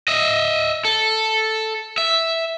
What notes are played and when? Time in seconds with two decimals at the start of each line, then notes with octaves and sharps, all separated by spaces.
0.08 D#5 E5
0.85 A4
1.98 E5